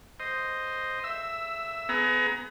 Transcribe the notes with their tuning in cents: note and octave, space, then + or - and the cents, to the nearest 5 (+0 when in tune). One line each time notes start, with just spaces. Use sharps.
C5 +0 D#5 +0
E5 +15 E6 +0
B3 +25 G#4 +35 A#5 +25